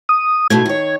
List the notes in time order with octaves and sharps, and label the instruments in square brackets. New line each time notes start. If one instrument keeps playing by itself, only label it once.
[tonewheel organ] D#6
[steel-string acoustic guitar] G#2 B2 A3 [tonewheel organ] G#6
[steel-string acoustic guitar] D#3 C#5